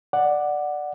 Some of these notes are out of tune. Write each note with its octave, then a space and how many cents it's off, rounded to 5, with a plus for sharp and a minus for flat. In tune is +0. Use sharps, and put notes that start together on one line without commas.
D5 +10 F#5 +0